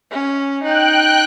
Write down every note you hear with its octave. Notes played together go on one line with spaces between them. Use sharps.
C#4
D#4 G5 F#6